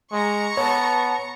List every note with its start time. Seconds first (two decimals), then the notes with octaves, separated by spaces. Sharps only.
0.12 G#3 A#5 C#6
0.57 B3 C#5 A5